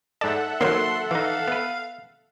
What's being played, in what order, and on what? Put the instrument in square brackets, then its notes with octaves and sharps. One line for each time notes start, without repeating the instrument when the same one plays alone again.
[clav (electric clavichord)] G#2 A5 [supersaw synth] A4 E5 F#5 [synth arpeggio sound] D5
[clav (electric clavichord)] D#3 F#3 [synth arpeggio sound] A#3 C5 [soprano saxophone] C6
[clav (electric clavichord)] E3 D#4 [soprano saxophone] F5
[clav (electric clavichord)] B3 B4